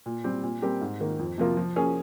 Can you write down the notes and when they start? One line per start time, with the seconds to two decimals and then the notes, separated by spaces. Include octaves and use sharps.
0.06 A#2
0.24 G3 C4 G4
0.43 A#2
0.62 G3 C4 G4 A#4
0.81 G#2
1.00 D#3 A#3
1.19 F2
1.38 C3 F3 A#3 F4
1.57 F3
1.76 A#3 C#4 G#4